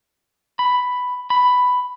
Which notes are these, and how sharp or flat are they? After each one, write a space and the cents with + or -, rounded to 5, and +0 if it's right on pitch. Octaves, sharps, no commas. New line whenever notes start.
B5 +5
B5 +5